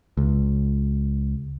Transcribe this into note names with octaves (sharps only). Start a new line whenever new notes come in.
C#2